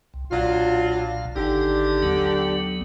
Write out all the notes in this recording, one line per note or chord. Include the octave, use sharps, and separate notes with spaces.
C2
B1 A#2 F#3 D4 F4 F5
G#1 D3 D#4 G4
D#2 F#3 B3